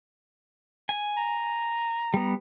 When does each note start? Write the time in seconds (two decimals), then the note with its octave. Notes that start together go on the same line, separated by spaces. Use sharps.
0.89 G#5
1.17 A#5
2.14 G3 B3